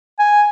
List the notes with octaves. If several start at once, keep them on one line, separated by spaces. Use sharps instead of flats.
G#5